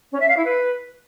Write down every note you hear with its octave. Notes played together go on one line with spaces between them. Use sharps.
C#4
E5
F5
E4
B4